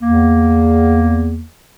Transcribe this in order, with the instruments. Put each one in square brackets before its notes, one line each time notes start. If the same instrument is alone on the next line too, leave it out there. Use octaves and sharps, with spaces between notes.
[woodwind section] E2 A#3